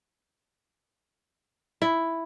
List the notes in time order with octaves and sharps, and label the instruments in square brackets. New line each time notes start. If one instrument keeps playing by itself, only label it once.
[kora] E4